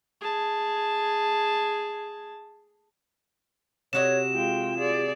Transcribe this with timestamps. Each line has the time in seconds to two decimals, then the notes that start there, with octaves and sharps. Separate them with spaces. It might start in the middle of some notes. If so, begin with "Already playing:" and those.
0.21 G#4 A5
3.93 C3 F#4 C#5 D#5 E7
4.33 G#3 F4 G5
4.78 G#4 D5